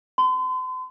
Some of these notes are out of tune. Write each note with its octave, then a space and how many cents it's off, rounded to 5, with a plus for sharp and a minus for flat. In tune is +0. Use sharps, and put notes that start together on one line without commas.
C6 -40